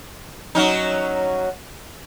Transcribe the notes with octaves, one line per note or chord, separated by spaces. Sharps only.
F#3 C#4 D#4